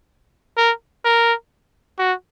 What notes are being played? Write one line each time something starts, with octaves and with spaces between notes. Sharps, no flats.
A#4
A#4
F#4